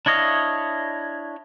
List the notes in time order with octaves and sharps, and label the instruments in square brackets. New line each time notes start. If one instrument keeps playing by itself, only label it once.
[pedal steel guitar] D4 E4 C#5 D#5 F5